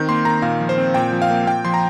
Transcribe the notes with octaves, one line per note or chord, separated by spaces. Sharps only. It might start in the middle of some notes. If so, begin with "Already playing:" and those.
Already playing: D#3 C4 G6
A#3 C6
D#3 A#5
A#2 F5
F3
C5
C4
A#2 G5
F3
F5
A#3
A#2 G5
F3 C6
A#5